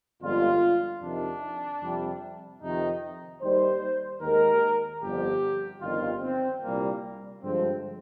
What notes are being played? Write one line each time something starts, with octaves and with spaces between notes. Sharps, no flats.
G1 F2 D3 G#3 F4
F2 C3 D#3 D4
F2 C3 G3
F2 C3 D#3 D#4
D#2 D#3 G3 C5
D#2 D#3 G#3 A#4
G1 F2 D3 F3 G4
G1 F2 D#3 G3 F4
C4
C2 A#2 G3 A#3
G2 D3 F3 G#3 C4